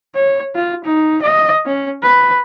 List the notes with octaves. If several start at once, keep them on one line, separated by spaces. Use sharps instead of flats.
C#5
F4
D#4
D#5
C#4
B4